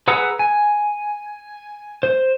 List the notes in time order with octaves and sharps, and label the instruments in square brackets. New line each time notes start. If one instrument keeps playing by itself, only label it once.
[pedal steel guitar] G#4 B4 F#5 A#5 E6
G#5
C5